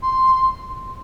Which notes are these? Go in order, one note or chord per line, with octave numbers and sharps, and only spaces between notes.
C6